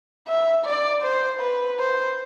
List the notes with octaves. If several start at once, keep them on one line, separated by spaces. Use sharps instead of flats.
E5
D5
C5
B4
C5